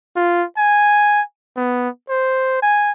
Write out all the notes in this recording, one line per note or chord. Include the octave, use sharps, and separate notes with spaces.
F4
G#5
B3
C5
G#5